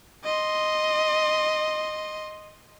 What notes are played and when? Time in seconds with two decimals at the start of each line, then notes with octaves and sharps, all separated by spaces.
0.24 D#5 C6